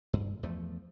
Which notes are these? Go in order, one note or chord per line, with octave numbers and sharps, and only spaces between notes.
G2
E2 F3 A3